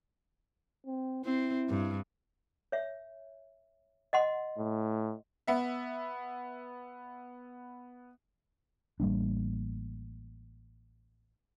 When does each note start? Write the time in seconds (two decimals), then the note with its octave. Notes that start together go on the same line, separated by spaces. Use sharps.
0.86 C4
1.25 C4 E4
1.70 G2
2.72 C#5 E5
4.13 D#5 F#5 C6
4.58 A2
5.48 B3 E5
9.00 A1 G3 A#3 D4